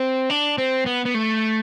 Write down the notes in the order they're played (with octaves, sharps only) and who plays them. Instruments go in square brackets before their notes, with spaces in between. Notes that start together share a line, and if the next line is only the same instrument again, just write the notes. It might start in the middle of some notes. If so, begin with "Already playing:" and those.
Already playing: [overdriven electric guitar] C4
D4
C4
B3
B3
A3